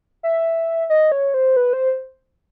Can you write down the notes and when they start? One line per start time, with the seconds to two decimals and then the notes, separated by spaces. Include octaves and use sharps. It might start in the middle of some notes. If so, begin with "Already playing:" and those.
0.23 E5
0.90 D#5
1.12 C#5
1.34 C5
1.56 B4
1.73 C5